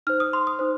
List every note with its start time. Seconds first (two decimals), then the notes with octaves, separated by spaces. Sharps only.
0.07 D#4 C5 F6
0.20 D#6
0.33 C6
0.47 D#6
0.59 D#4 C5